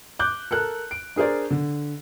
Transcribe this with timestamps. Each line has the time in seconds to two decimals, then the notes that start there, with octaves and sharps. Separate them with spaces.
0.19 D6 F#6 G6
0.51 A4 A#4 F#6
0.91 D7
1.16 D4 G#4 A#4 C5 D5
1.50 D3